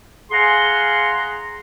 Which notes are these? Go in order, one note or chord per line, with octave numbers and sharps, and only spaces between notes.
G#4 F5 F#5 G#5 A#5 C6